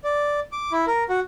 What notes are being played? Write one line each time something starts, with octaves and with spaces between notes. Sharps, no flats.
D5
D6
E4
A#4
F#4